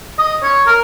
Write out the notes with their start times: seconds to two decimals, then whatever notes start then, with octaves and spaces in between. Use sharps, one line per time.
0.19 D#5
0.43 C#5
0.66 A#4